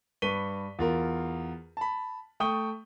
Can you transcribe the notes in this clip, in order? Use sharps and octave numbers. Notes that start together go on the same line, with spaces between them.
G2 B4 C#6 B6 D#7 G7
E2 F4 A#4
A5 B5
A3 G5 C#6 D#6 G7